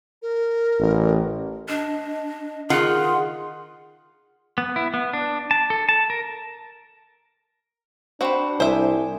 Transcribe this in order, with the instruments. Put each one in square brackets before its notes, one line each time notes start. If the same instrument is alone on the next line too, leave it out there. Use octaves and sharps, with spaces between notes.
[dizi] A#4
[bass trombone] A1
[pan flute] D4 [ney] D#5
[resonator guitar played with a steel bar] D#3 F4 F#5 [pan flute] G#4 [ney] C6
[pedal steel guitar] B3
E4
B3
D4
A5
A4
A5
A#4
[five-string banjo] C4 F#4 [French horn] D4 [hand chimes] C5 G5 B5
[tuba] C2 [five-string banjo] C5 E5 [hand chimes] G#5 D#6